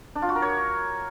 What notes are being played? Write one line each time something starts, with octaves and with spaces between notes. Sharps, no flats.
D4
F4
F#4
A#4
C#5